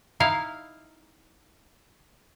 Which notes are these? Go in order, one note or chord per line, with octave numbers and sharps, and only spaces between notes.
D#4 E4 F5